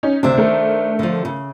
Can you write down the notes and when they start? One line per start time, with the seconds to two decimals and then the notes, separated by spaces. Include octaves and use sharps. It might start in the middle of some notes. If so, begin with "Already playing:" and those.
0.03 C#4 D#4
0.23 D2 C3 D4 C5 E5
0.37 D#3 A3 A#4
0.99 D3 F3
1.25 C#3